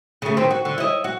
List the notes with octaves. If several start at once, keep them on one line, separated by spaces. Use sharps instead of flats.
C#3 A3
D#3 C4
F#4
D3
E4 D#5
F#4